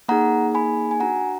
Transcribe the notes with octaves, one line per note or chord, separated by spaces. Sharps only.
A#3 D#4 G#4 F#5 A#5
G#5 B5
G#5
D4 F#4 F#5 A#5